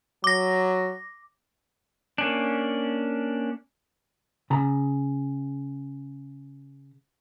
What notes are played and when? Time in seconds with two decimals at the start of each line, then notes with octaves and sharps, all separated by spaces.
0.24 F#3 D6 A#6
2.18 A#3 C#4 D4
4.50 C#3 A#5 B5